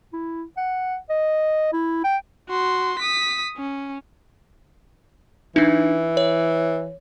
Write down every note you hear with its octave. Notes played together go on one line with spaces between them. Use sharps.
E4
F#5
D#5
E4
G5
F#4 C6
D#6 B6
C#4
E3 D4 D#4
C#5